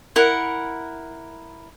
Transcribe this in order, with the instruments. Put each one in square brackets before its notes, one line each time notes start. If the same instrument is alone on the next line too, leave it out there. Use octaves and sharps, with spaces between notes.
[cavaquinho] E4 A#4 F#5